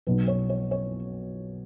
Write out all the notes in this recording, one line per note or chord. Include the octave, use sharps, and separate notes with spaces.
B1 B2 F#3 B4
C#5
C#5
C#5